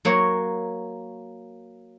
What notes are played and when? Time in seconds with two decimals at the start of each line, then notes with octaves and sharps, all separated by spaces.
0.05 F#3 A#3 C#5